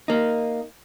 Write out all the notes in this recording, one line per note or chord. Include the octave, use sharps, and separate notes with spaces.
A#3 D#4